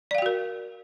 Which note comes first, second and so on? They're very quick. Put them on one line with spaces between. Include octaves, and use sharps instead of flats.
D5 F5 G5 F#4 A#4